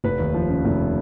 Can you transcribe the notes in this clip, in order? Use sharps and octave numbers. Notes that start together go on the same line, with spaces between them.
F1 B4
D#2
F3
C#3
F1